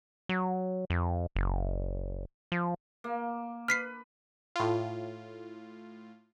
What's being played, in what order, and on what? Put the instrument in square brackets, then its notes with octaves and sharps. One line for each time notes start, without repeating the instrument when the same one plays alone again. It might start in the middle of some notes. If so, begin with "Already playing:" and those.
[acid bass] F#3
F2
F#1
F3
[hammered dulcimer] A#3
[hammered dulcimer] B4 [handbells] F6 B6 C7
[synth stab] A2 F4